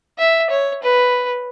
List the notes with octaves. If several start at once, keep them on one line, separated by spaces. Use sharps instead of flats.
E5
C#5
B4